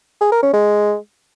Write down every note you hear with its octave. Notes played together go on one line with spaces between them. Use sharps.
G#4
A#4
C#4
G#3